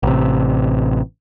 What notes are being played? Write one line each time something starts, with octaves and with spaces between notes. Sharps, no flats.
A1 C3